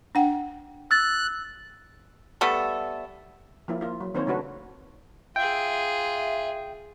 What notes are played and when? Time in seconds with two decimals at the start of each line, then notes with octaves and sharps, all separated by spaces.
0.15 D4 F#5 G5
0.91 E6 F#6 A6
2.41 G3 A3 B3 A4
3.68 F3 A#3 E4
3.81 A#3 F4
4.01 F#3
4.15 D#3 A#3 C4 C5 C#5
4.27 C#3 A3 C#4 D4 F#4 B4
5.36 F4 G#4 E5 G5